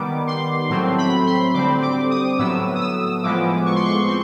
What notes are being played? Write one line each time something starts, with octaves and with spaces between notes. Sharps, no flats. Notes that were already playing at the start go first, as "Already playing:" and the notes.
Already playing: D#3 G3 B3 D6
C6
A2 F#3 A3 C4 C6
B5
C6
D3 G3 C4 D6
D6
D#6
A2 F#3 B3 E6
D#6
E6
A2 F3 G#3 B3 D6
C#6
C6
C#6
C4 C6